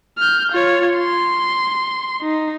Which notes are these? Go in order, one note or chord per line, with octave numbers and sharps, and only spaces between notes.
F6 G6
F4 C#5
C6
D#4